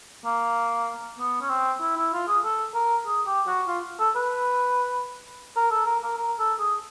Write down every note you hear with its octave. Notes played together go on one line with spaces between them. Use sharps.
A#3
B3
C#4
C4
E4
E4
F4
G#4
A4
A#4
G#4
G4
F#4
F4
A4
B4
A#4
A4
A#4
A#4
A#4
A4
G#4